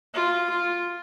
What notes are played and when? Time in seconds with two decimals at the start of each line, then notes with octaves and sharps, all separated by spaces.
0.14 F4
0.50 F4